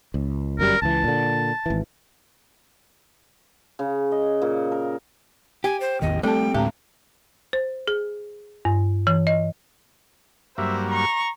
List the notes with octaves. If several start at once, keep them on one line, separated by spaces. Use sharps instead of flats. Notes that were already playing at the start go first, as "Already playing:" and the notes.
C#2
G1 F#2 G3 A#4
C#2 E3 A5
A#2 D3
G#1 E3
C#3
D#5
A#2
A#4
G4 G#5
C5
A1 E2 D#3 D#5
G3 A3 C4 A4 G5 A5
D2 A2 G#3 C4 G4 A#5
C5
G#4
G2
E3
D#5
G2 F#3 A#3 C5 E5
A#5 C#6